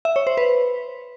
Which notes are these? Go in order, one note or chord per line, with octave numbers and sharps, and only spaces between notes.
E5
C#5
C5
B4